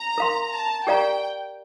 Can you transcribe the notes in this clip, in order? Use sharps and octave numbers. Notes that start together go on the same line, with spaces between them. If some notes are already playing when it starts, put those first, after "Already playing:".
Already playing: A#5
A#4 F5 C6
A5
G4 A#4 D5 F5 G5 A#5